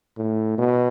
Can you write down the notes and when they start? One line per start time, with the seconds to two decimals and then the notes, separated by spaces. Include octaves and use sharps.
0.18 A2
0.58 B2